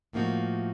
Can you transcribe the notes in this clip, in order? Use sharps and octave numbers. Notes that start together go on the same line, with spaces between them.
A2 F3 A#3 D#4 F#4